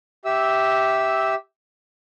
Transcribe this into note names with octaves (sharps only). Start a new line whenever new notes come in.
G4 E5 E6